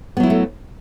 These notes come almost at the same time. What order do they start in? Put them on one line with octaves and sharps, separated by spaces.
B3 F#3 E4 G#3 A3